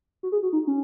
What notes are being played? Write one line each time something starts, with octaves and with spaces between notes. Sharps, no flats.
F#4
G#4
F#4
D#4
C#4